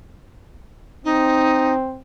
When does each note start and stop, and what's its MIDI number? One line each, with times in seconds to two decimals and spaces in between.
1.05 2.00 60
1.05 1.73 63